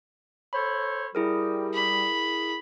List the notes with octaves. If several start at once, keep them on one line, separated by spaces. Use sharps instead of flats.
A4 C5 C#5 B5
G3 E4 G#4 A#4
B5